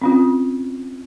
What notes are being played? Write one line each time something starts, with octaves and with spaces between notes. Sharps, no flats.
C4 C#4 F4